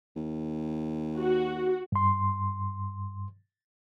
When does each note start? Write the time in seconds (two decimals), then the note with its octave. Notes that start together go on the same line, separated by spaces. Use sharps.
0.16 D#2
1.19 F#4
1.92 G2 C6